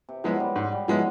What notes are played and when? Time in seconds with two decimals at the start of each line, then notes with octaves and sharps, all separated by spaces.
0.09 C3
0.24 F3 F#3 G#3 B3 E4
0.40 G3
0.56 G#2
0.72 G3
0.88 F3 F#3 G#3 B3 E4